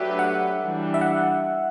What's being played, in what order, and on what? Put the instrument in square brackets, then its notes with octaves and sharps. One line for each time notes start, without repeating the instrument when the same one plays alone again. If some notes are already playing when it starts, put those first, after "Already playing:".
Already playing: [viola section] F#3 A3 D4 G4 B4 [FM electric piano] E5
[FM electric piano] F#5
[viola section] E3 G3 D4
[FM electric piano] E5
F#5